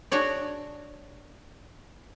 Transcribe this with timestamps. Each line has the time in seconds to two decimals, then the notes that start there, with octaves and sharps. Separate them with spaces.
0.12 D4 F#4 G#4 C#5 D5